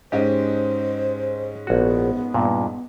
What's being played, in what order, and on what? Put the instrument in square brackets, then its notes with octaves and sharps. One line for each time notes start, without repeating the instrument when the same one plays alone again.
[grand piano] G#2 C#4 D#5 [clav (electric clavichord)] G4 [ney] C5
[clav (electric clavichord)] A#1 F#4 [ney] B3
[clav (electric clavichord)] G2 A#2